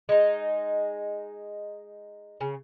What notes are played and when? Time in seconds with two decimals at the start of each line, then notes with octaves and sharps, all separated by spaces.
0.09 G#3 D#4
2.41 C#3